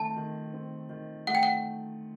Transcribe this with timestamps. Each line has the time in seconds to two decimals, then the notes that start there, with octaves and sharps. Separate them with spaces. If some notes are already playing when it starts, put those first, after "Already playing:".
Already playing: D#3 A3 C4 A5
0.16 D#3
0.53 C4
0.89 D#3
1.27 A3 F#5
1.35 G5
1.43 F#5